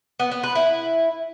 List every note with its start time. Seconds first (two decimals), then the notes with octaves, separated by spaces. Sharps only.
0.19 B3
0.31 B3
0.43 B4
0.55 E4